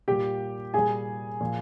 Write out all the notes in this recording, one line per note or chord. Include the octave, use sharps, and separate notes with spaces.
A#2 G3 G4 G5
A#2 G3 G#4 G#5
A#2 F3